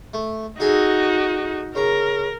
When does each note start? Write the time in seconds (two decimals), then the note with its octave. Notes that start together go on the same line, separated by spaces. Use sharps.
0.14 A3
0.60 D#4 F#4 G#4 A4 E5
1.75 C#3 A#4 A#5